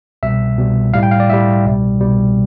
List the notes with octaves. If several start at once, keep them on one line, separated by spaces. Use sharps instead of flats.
C2 B2 G3 E5
C2 B2 G3
A2 G3 F5
G5
F5
D5
A2 G3 E5
C2 B2 G3
C2 B2 G3